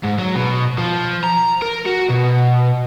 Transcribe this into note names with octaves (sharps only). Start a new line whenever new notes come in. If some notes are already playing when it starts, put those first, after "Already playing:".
G#2
F#3
B2
F3
A#5
A#4
F#4
B2